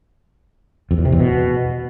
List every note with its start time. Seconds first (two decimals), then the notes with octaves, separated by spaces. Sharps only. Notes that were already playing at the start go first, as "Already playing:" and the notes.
0.91 F2
0.98 E2
1.05 C3
1.12 E2
1.20 B2